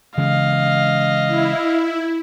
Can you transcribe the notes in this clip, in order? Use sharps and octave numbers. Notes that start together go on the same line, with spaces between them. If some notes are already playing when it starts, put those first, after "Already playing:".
C#3 E3 G#3 D#5 F5
E4